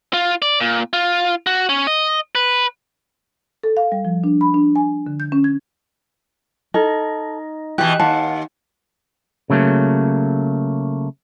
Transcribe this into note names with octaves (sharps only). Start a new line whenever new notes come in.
F4
D5
A#2
F4
F#4
C#4
D#5
B4
A4
F5
G3
F3
D4
B5
D4
G#5
D3
G6
C#4
G#6
D#4 A4 D#5
B2 E3 G4 F#6
D#2 F5 F#5 A5
C#3 F#3 A3 A#3